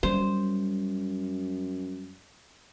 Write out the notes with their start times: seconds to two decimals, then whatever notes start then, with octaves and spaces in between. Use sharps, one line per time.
0.03 F#2 G3 C5